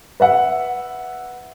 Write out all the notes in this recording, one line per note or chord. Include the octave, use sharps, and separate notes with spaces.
B4 E5 F#5